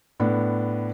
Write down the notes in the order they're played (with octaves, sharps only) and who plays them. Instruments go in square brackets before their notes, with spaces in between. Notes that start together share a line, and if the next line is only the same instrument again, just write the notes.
[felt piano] A2 B3 D4